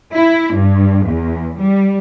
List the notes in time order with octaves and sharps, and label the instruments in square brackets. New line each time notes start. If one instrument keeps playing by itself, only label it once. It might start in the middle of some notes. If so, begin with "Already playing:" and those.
[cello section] E4
G2
E2
G3